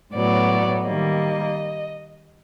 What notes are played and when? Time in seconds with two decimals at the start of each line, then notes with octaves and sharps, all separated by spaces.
0.15 A2 F#3 B3 D5
0.86 D#3 G3 A#3 D#5